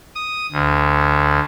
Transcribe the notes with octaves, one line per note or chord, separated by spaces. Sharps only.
D#6
D2